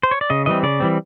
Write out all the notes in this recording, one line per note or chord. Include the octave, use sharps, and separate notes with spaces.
C5
C#5
D5
C#3 D#5
E3 G3 C4 D#5
C#3 D5
E3 G3 C4